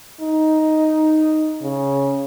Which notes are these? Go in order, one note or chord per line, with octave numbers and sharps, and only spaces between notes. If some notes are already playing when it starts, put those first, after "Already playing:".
D#4
C#3